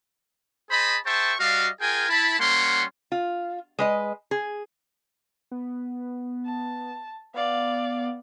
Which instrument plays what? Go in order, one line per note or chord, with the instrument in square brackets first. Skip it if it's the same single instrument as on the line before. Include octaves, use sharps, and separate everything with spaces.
[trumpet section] G#4 C5 D#5 A5 B5
G#4 C5 E5 G5 A5 C#6
G3 F#4 D5 D#5 F5
F4 G#4 A#4 G5 G#5
E4 A5 B5
G3 A#3 C#4 F#5 C6
[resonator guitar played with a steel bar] F4
G#3 B4 D#5
G#4
[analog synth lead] B3
[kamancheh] A5
[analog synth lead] B3 [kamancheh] D5 F5